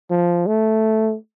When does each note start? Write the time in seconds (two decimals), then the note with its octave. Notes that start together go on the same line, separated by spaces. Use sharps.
0.10 F3
0.47 A3